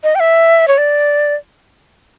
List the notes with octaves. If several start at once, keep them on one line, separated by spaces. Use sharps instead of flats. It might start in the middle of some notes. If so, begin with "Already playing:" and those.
D#5
G5
E5
C#5
D5